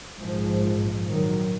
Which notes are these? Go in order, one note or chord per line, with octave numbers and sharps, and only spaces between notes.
A#1 G#2 F3 G#3
D#3 F#3